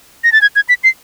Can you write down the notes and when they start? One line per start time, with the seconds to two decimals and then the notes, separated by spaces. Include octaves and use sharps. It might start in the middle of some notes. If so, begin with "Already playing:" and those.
0.24 A#6
0.32 A6
0.42 G#6
0.56 G#6
0.69 B6
0.84 C7